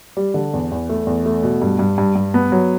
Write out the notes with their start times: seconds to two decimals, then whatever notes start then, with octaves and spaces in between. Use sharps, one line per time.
0.17 G3
0.34 D3
0.54 E2
0.71 E2
0.89 A3
1.07 E2
1.26 A3
1.43 B2
1.62 G2
1.79 G2
1.98 G2
2.15 G2
2.34 B3
2.52 F#3